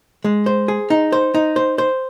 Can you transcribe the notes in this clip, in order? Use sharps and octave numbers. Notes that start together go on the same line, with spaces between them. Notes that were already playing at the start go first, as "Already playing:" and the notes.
G#3
C5
G#4
D#4
C5
D#4
C5
C5